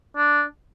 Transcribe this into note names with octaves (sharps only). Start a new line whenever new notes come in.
D4